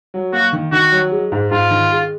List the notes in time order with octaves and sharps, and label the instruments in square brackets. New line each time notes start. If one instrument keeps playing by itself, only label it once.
[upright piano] F#3
[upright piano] A#3 [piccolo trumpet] F#4
[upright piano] D#3
[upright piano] D#3 [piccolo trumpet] F#4
[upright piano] F#3
G#3
G#2
[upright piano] G#2 [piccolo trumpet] F4
[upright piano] D#3
G#3